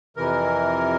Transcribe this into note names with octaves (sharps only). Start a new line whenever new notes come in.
F2 C3 E3 A#4